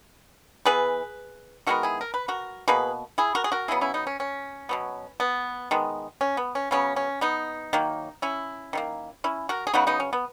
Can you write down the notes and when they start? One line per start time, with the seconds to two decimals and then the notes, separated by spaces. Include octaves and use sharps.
0.66 E3 B3 G#4 B4
1.67 D#3 G#3 B3 F#4 A#4
1.83 E4 G#4
2.01 A#4
2.14 B4
2.28 F#4 A#4
2.68 B2 A#3 G#4 B4
3.18 E4 G#4
3.35 F#4 A#4
3.44 G#4
3.52 F#4 A#4
3.68 C#3 F#3 B3 E4 G#4
3.81 C#4 E4
3.94 B3 D#4
4.07 C#4
4.20 C#4
4.69 B2 F#3 B3
5.20 B3
5.71 D#3 G#3 B3
6.21 C#4
6.37 B3
6.55 C#4
6.71 C#3 F#3 B3 C#4
6.96 C#4
7.21 B3 D#4
7.73 D#3 F#3 A#3
8.22 C#4 E4
8.73 D#3 F#3 A#3
9.24 C#4 E4
9.49 F#4 A#4
9.67 G#4
9.74 C#3 F#3 B3 D#4 F#4
9.87 B3 D#4
10.00 C#4
10.13 B3